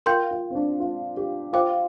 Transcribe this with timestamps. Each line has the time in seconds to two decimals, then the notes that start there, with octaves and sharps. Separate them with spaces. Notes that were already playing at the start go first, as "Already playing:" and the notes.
0.06 F4 A#4 G5 C6 G6
0.31 F4
0.50 C4
0.55 D4
0.80 F4
1.17 G4
1.53 F4 C5 G5 D6